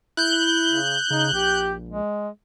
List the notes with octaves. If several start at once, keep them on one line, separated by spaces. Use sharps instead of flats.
E4 F#6 G6
C#3
C#3 D#4
A#1 G4
G#3